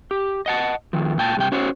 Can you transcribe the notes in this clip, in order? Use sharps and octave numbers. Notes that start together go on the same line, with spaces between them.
G4
D#5 F#5 A5
F2 A#2 D#3 F3
A#2 G5 A5
G2 C3 G5
C#4 F#4 C5 C#5